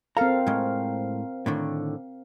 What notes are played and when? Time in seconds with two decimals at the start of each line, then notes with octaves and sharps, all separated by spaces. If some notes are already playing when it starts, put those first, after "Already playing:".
0.17 C4 A4 A#4 F5 A#5
0.47 A2 G#3
1.46 A2 D3 D#3